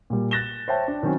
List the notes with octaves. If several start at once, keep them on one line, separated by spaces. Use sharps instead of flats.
A#2 G3
F#6 A6 A#6 E7 G7
C5 C#5 E5 G5 A5
D4
D#3 F#3 C4 C#4